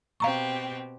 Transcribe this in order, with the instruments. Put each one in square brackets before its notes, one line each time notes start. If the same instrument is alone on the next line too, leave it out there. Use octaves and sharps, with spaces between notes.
[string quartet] B2 C4 G4 [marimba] F5 A#5 C#6